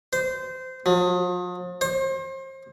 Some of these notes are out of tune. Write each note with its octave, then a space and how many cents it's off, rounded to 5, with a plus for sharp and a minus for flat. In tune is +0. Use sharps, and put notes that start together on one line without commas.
C5 -20
F3 +40
C5 +35